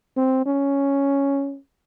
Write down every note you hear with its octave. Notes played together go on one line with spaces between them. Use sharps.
C4
C#4